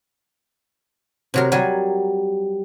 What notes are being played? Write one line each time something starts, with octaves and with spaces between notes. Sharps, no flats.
C3 F#3 A#4
F#3 G3 G#5